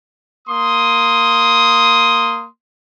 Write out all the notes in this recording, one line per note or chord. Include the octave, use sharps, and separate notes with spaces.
A#3 C6 D#6